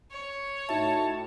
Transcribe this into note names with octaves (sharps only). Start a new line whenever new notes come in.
C#5
A2 D#4 F#4 E5 A5